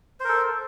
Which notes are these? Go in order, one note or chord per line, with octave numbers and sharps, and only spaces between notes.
A4 A#4 C5